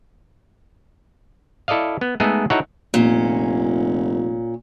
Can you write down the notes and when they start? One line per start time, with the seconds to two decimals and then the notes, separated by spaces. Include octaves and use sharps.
1.68 E4 A4 D5 D#5 F5
2.01 B3
2.20 G#3 A3 B3 D#4 G#4 A4
2.50 D#4 E4 F#4 A4 C#5 F#5
2.94 F1 A#2 C#4